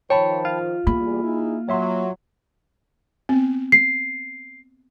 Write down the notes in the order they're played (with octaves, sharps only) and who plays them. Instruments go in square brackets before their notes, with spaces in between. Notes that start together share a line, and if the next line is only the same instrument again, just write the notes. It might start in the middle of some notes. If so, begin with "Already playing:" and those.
[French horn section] D#3 F3 C5 [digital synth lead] C#5 [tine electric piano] G5 A5 B5
[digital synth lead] F4
[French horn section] E2 G3 G#4 [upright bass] A#3 [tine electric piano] B5
[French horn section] D#4 E4 G#4
[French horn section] F#3 [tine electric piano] C#5 E5 C6
[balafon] B3 C4
[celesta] C7